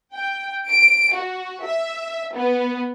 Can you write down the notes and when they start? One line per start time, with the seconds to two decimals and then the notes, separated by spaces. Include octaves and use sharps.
0.14 G5
0.69 D7
1.14 F#4
1.65 E5
2.35 B3